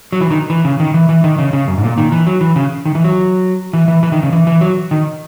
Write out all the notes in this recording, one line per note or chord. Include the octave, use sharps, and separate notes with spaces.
F#3
E3
D#3
E3
C#3
D#3
E3
E3
D#3
C#3
C#3
F#2
G#2
A#2
D#3
E3
F#3
E3
C#3
D#3
E3
F#3
E3
E3
E3
D#3
C#3
E3
E3
F#3
D#3